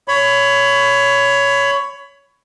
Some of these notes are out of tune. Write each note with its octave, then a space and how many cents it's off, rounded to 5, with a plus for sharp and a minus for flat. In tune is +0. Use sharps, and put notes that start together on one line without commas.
C#5 +15 B5 +20